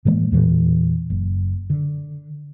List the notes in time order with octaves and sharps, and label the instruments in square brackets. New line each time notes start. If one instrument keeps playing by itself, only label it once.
[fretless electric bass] A2 E3 G#3 A#3
E2 A#2 E3
F#1
D3